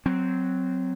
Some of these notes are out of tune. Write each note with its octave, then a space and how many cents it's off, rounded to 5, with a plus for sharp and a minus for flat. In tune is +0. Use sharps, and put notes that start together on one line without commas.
F#3 +0 C4 -15